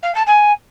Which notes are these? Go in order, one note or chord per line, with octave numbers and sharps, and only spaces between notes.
F5
A5
G#5